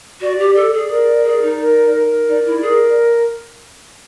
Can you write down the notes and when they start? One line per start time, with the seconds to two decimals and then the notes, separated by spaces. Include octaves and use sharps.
0.21 F#4 D5
0.39 G4
0.55 A4 D5
0.73 G#4
0.90 G#4 A#4
1.25 G#4 D5
1.42 D#4
1.59 A#4
1.94 A#4
2.28 D#4 D5
2.45 E4
2.62 G#4 A#4